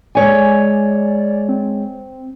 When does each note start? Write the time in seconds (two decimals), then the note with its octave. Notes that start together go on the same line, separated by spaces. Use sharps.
0.15 G#3 C#5 D5 G#5
1.49 C4